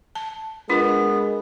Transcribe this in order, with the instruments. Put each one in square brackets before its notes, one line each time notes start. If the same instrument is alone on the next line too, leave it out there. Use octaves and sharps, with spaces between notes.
[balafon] A5
[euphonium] G#3 [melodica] B3 [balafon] D4 F4 B4 [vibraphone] A#4